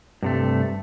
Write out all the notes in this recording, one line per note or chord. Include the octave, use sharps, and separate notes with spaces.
G2 C3 A3